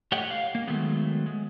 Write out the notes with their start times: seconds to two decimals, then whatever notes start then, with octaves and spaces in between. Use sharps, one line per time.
0.12 A3 G4 C#5 D#5 F#5 G5
0.31 F5
0.55 A#3
0.67 D#3 F#3 G#3 A3 B3
1.26 G#3